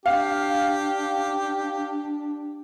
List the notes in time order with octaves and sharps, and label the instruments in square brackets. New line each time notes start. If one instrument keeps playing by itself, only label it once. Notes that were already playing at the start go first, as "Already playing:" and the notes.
[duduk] D4 [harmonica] G4 [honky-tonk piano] F5